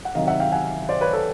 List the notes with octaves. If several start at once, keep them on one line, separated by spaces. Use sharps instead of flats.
F#5
C3 D#3 F#3 D#5 F5
E5 F#5
F5 G5
F#5 G#5
C5 D5
B4 C#5
A4 B4